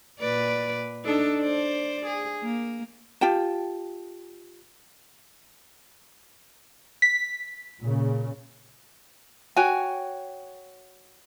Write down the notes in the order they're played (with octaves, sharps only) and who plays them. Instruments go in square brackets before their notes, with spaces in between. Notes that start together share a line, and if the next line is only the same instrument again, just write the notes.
[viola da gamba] A#2 B4 D5
D4 D#4 A4
C5 D5
G#4
A#3
[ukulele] F4 G4 G5 A5
[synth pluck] B6
[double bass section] A#2 C#3
[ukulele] F#4 C#5 G5 G#5